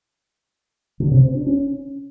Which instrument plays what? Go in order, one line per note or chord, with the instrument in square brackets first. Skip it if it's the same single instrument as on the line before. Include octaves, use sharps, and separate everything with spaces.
[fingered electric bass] D3
C3
C4
D4
C#4